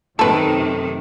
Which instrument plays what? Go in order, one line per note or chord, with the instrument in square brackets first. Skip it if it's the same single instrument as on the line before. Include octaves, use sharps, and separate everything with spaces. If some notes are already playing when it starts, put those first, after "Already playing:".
[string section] F#2 C3 D#3 [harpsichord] A3 [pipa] A4 B4